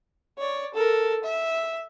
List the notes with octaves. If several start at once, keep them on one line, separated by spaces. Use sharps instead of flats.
C#5 D5
A4 A#4
E5